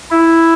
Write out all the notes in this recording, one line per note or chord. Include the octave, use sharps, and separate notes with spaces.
E4